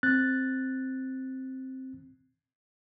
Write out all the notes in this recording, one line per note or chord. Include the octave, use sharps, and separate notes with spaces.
C4 F#6 A6